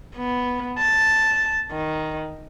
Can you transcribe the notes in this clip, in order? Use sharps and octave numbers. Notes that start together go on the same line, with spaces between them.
B3
A5
D#3